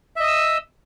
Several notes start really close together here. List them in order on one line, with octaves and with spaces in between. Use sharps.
E5 D#5 D#6 E6